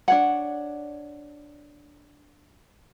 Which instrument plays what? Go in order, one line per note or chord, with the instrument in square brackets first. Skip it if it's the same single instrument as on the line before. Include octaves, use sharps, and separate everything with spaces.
[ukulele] D4 C#5 F#5